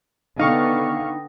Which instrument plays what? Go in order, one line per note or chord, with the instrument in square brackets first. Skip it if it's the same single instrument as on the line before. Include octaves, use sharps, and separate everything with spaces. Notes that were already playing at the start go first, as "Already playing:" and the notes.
[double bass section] D3 B3 [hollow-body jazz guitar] D#4 [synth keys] F5 C#6 [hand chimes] G5 D#6 A#6